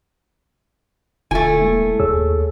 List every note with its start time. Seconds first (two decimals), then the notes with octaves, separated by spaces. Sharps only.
1.31 D#1 D3 A3 E4 F4 G#5
1.60 G#3 A#3 E4
2.00 D#2 G#4 C#5 E6